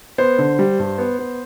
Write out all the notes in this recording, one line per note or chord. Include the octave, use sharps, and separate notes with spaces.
B3 C5
D3
G3
G2
B3
B3